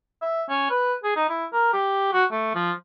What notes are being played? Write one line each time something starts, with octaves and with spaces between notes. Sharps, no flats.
E5
C#4
B4
G#4
D#4
E4
A#4
G4
F#4
A3
F3